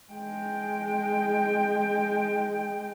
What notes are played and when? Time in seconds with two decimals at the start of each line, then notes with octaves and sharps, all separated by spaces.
0.13 G#3 G5